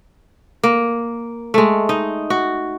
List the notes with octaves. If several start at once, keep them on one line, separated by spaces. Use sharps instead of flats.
A#3
G#3 A3
D#4
F#4